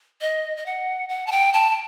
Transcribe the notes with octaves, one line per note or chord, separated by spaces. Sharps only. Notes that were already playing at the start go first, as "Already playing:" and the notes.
D#5
D#5
F#5
F#5
A5
G5
A5